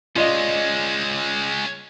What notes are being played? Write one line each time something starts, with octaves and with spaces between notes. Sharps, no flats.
G#3 C#4 F4 D5 D#5